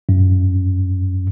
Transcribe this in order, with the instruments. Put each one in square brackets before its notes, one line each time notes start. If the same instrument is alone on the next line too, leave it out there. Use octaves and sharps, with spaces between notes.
[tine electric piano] F#2